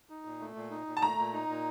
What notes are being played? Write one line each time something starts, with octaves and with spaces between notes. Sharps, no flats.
D#4
A#2
A3
A#2
D#4
A#2
A5
A3 A#5
A#2
D#4
A#2